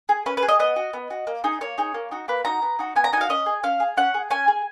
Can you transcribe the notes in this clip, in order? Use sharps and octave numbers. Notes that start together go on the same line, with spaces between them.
G#4
C#4 B4
B4
G#4
D#5
B3 D#5
F#4
B3
F#4
A#3
D#4 G#4
A#3 C#5
D#4 G#4
A#3
D#4 F#4
A#3 B4
D#4 F#4 A#5
B3
D#4 F#4
B3 G#5
A#5
D#4 F#4 F5 G#5
C#4 D#5
G#4
C#4 F5
G#4
C#4 F#5
G#4
C#4 G#5
G#4